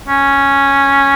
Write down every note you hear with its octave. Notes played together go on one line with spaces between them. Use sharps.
C#4